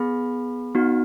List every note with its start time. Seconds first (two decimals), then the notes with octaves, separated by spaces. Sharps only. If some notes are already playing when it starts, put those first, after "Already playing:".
Already playing: B3 G#4 B5
0.75 B3 D#4 F#4